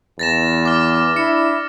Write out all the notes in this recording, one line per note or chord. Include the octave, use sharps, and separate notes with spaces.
E2 A6 A#6 E7
D6 F6
D4 E4 C#7